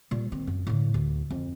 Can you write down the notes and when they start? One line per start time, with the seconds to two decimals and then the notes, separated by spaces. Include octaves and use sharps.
0.11 A#2 G3
0.32 D#3 C4
0.47 F#2
0.67 A2 D3
0.94 D2
1.30 F2